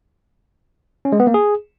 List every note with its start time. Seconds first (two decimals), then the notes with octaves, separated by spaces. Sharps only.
1.05 C#4
1.12 G#3
1.20 B3
1.27 A#3
1.34 G#4